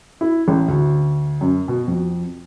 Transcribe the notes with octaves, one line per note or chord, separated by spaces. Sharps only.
E4
A1
D2
F#2
B2
F2